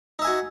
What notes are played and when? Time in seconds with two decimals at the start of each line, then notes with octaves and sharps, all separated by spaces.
0.19 D#4
0.22 E5
0.24 G#5
0.27 F#4